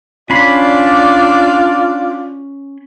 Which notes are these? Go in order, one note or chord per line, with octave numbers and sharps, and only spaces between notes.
C#4 D4 F4 D5 B5 C6